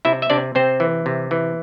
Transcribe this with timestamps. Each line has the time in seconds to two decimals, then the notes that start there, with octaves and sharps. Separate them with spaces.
0.05 C3 E4 E5
0.22 E5
0.30 C3 D4 D5
0.55 C3 C4 C5
0.80 E3
1.06 C3
1.31 E3